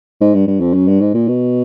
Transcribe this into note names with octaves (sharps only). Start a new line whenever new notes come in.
G#2
G2
G2
F2
F#2
G2
G#2
A#2
B2